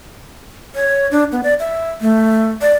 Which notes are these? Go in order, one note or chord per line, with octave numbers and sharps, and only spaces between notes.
C#5
D4
B3
D5
E5
A3
D5